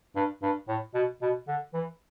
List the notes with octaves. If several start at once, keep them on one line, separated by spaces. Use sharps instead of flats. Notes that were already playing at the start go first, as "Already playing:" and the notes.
G2
G2
A2
B2
B2
D3
E3